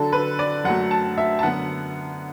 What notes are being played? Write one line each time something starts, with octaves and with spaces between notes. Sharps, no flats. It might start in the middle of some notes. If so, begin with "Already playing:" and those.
Already playing: D3 F#3 D4 A4
B4
D5
F#2 F#3 A3 F#5
A5
E5
A5
F#2 D3 B3 F#5